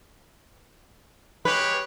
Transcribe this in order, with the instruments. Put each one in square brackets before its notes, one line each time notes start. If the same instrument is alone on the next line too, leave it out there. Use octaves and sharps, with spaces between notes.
[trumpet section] G#3 G4 C#5 [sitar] B4